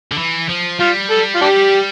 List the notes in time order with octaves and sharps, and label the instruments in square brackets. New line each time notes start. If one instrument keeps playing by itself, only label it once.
[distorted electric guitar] D3
E3
F3
[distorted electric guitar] G3 [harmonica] F4
[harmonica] A4
F4
D4 G4